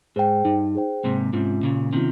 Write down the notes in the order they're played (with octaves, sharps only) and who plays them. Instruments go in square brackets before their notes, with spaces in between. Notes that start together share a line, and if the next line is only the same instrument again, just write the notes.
[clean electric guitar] G#2 [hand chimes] G#4 C5 G5
[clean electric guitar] G2 [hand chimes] D#4
[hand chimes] G#4 C5 G5
[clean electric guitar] G#2 C3 [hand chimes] A#3
[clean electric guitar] G#2 C3 [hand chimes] C#4 F4
[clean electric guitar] A#2 C#3 [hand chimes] A#3
[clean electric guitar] C3 D#3 [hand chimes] C#4 F4